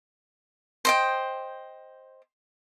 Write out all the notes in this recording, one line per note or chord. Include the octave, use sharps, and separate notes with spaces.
C5 D#5 G5